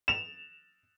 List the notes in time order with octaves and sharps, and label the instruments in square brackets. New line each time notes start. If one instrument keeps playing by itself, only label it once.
[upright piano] E7 F7